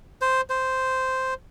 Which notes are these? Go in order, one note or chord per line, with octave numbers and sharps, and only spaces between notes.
C5
C5